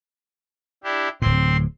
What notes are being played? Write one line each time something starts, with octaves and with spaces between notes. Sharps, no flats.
D4 E4 G4
D1 A2 C4 C6